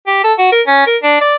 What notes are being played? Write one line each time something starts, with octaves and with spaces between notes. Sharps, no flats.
G4
A4
F#4
A#4
C#4
A#4
D4
D5